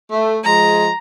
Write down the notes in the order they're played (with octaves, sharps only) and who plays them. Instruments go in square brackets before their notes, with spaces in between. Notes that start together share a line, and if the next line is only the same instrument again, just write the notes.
[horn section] A3
[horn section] F3 G#3 [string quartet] A#5